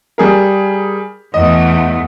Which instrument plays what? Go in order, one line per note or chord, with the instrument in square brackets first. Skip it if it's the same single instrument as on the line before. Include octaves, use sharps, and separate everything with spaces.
[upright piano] G3 G#4 A#4
[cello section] E2 A3 [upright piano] D#5